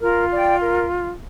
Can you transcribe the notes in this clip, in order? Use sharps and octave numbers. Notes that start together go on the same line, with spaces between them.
F4 A#4
D5 G5
A#4